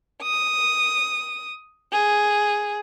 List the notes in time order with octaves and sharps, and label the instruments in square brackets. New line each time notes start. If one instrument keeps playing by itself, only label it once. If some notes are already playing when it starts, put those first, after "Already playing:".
[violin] D#6
G#4